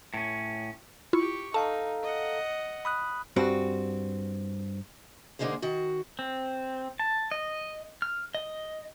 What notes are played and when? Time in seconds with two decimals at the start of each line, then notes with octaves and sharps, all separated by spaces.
0.14 A2 C#4
1.13 E4 F4 G4 C#6
1.54 D#4 A4 F5 A5 A#5
2.03 D#5 F#5
2.85 B5 D#6 F#6
3.36 G2 C4 F#4
5.39 D3 G#3 A#3 D#4 G#4 C5
5.62 D#3 F#4
6.19 C4
6.99 A5
7.31 D#5
8.02 F6
8.35 D#5